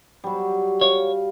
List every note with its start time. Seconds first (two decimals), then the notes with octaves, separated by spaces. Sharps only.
0.24 F#3 G3
0.81 C#5 F5